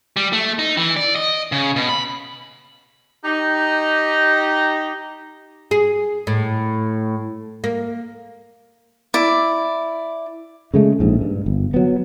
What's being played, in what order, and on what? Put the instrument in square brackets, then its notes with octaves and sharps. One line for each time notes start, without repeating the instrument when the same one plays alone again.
[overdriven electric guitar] G3
A3
D#4
E3
D5
D#5
C#3
B2
B5
[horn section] D#4 G4
[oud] G#4
A2
A#3
[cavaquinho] E4 D5
[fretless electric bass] C#3 G#3 A3
A#1 G#2
G2
G1
F#3 B3